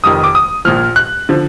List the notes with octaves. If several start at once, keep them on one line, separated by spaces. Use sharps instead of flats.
F1 F2 D#3 D#6
D6
D#6
A#1 A#2 F3 F6
F#6
D3 F3